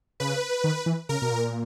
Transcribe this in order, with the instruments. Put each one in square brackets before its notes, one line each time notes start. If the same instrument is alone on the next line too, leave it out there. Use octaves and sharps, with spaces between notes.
[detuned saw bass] C#3 [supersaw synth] B4
[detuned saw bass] D#3
E3
[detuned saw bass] C#3 [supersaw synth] A#4
[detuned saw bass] B2
A#2